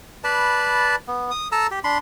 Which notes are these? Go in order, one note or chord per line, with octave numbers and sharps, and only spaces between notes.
B4 D5 A5 B5
B3
D#6
A4 A5 A#5 E6
G4
D4 B5 C6